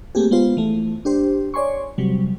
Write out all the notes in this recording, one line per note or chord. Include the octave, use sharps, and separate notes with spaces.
A3 A#3 C4 G4 G#4
G#3 B3 F4 C5
E3 A3
D4 G4 C5
C#5 D5 G#5 C6 C#6
C3 F#3 G3